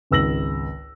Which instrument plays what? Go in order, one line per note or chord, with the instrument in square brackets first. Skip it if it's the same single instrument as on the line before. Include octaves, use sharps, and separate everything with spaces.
[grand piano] G#1 C#2 E6 A#6 F#7